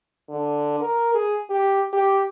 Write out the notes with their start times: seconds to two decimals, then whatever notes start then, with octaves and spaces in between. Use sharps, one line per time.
0.29 D3
0.80 A#4
1.14 G#4
1.50 G4
1.93 G4